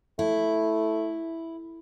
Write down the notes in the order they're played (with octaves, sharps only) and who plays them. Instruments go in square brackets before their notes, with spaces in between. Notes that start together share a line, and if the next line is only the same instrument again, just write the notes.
[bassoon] A3 [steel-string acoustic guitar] E4